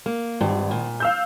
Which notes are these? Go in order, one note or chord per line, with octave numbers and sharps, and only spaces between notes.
A#3
G#1 G2
A#2
F5 E6 G6